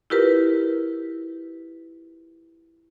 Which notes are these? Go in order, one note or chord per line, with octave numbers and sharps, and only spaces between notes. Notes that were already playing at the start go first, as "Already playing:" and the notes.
E4 F4 G4 A#4 B4